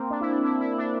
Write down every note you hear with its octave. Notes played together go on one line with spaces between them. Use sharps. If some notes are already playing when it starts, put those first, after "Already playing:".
Already playing: A#3 C4
D4
E4
D4
E4
E4
D4